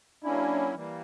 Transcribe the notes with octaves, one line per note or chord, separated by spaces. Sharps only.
F#3 A#3 C#4 D4 E4
E3 G3 A#3